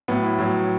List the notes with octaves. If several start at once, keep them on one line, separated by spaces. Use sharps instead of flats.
A2 F#3 B3
E4
A2 F#3